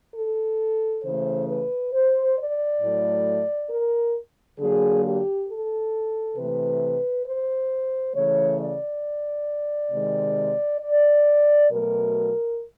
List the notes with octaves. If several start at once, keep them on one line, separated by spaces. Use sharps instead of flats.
A4
C#3 E3 A3 C5
B4
C5
D5
A2 F#3 A3
A#4
D3 F#3 A#3 G#4
G4
A4
C3 E3 A3 B4
C5
C#3 E3 A3 C#5
D5
C3 D#3 G#3
D5
B2 F#3 A3 A#4